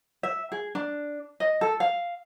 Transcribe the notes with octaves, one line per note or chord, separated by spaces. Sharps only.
E5
G#4
D4
D#5
A4
F5